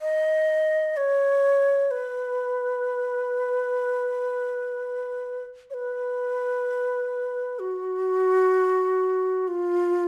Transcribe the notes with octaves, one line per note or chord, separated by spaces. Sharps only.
D#5
C#5
B4
C#5
B4
F#4
F4